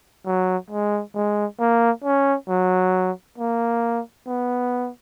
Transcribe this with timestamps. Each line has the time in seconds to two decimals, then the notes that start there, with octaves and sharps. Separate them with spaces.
0.26 F#3
0.71 G#3
1.14 G#3
1.60 A#3
2.04 C#4
2.49 F#3
3.38 A#3
4.27 B3